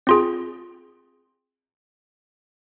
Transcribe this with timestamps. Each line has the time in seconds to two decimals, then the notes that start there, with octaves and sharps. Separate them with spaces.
0.07 C4 F4 G#4